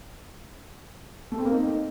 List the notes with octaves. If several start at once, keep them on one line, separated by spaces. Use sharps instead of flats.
A3
C4
A#3
D#4